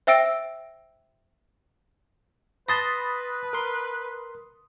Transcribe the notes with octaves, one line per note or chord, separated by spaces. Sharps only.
C5 E5 G5 E6 A#6 D7
B4 A5 B5 C6 D#6 A6 A#6
A#4 C6